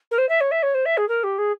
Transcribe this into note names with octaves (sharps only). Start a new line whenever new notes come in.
A#4
C5
E5
C#5
E5
C#5
C5
E5
G#4
A#4
G4
G#4